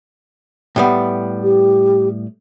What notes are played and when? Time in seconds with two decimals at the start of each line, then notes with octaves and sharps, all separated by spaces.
0.76 A2 G3 B3
1.43 G4